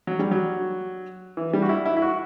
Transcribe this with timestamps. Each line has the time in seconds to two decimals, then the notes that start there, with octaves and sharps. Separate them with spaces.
0.07 F#3
0.19 G3
0.31 F#3
1.37 E3
1.53 G3
1.62 F#4
1.69 E4
1.86 E4
1.97 E4
2.02 F#4